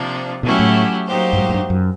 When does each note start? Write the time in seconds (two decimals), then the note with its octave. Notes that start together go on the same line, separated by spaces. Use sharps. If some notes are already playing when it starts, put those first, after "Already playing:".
Already playing: C3 F3 A#3 D4
0.43 B2 F#3 A3 C#4 E4 G4
0.59 A2
1.06 F#3 A#3 D#4 G4 C5
1.33 G2
1.38 G#2
1.49 G#2
1.54 G2
1.70 F#2